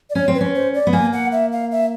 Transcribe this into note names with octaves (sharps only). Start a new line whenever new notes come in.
D5
C#4 C#5
C4
B4
C#4
C5
D5
B3
A#3 G#5
F#5
E5
F5
E5